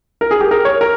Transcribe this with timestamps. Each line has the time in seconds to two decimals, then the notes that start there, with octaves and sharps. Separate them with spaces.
0.21 A#4
0.31 G#4
0.41 G4
0.51 A#4
0.65 C#5
0.81 A#4